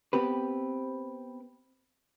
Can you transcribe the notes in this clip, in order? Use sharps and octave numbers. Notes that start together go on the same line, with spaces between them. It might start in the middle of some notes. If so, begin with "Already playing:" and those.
B3 C4 G4 B4